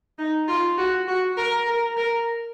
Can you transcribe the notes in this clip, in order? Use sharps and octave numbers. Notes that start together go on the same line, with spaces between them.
D#4
F4
F#4
F#4
A#4
A#4
A#4